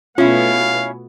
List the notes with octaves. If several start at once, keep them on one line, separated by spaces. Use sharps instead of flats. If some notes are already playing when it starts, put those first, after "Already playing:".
B2 A3 B3 C#4 E4 F4 F5